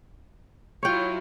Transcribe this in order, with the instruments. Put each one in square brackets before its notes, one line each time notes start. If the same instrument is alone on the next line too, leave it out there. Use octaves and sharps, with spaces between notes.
[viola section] F#3 E4 F4 [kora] C#5 G5